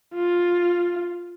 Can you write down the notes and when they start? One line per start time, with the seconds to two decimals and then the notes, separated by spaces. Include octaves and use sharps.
0.14 F4